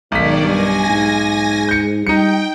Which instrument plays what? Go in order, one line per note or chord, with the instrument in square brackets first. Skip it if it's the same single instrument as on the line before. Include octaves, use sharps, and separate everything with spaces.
[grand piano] B1 B6 [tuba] G#2 [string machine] D#3 D5
[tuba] G2 [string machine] G#5 A#6
[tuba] G#2
[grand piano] G6 C#7
[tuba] G3 [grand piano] D#4 C#7 [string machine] G5